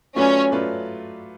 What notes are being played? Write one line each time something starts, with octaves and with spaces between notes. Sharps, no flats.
F#3 A3 C#4 F4 B4 D5
F#3 A3 F4 B4 D5